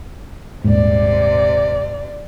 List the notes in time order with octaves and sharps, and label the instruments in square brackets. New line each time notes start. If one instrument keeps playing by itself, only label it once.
[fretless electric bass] D#1 G#2 [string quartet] C3 D5